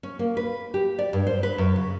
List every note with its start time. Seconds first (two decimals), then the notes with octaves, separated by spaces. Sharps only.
0.03 C#4
0.19 A#3
0.37 B4
0.74 G4
0.99 D5
1.13 G2
1.27 C5
1.43 B4
1.58 F#2
1.76 C#3